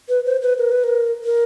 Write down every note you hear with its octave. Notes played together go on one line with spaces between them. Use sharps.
B4
C5
B4
A#4
B4
A#4
A#4